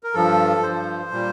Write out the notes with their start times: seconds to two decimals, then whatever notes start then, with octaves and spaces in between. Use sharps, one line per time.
0.03 A#4
0.14 G2 F3 A4
0.63 G2 F3 C5
1.11 A#2 G3